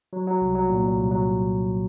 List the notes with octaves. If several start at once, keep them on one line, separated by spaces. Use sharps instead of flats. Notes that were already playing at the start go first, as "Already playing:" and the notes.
F#3
F#3
C2
F#3
A#2
A#2
C2
F#3